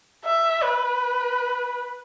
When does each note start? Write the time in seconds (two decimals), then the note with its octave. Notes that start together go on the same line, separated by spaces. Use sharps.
0.25 E5
0.63 B4